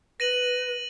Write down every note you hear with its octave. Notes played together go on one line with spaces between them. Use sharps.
B4 A#6 D#7 F#7